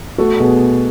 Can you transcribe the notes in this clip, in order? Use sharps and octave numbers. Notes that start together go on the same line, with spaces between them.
A3 F#4 A4
B2 G#4